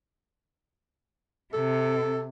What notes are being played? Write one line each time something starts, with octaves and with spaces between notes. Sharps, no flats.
C3 A4